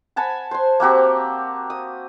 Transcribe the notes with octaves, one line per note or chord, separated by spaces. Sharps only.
F#5 G#5 A5 B5
C5 C6
A#3 C4 F#4 G4
D#6